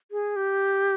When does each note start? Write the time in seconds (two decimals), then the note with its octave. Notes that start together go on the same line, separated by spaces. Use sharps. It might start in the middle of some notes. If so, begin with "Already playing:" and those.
0.11 G#4
0.36 G4